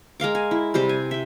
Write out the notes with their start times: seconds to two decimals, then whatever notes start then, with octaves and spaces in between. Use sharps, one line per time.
0.20 G#3 A#4 F5 D6
0.35 G#5
0.51 E4
0.74 C3 G3 G4 C5
0.89 G#5
1.11 E5 G5